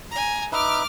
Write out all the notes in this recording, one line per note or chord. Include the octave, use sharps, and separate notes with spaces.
G#5 A#5
D#4 B4 E5 D6 F6